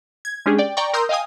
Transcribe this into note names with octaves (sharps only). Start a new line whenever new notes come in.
G#6
G#3 C#4 D4 G4 G#4
D5 G5
D5 G5 A#5 C#6
A#4 A#5 C6 D#6 E6 G6
D#5 F5 G5 G#5 D#6